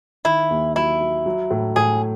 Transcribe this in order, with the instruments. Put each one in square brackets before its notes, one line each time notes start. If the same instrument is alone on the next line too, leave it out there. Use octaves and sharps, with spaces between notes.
[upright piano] D#3 [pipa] E4
[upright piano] D#2
[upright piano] F#3 [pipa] E4
[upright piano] F#3
F#3
A2
[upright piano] A2 [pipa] G#4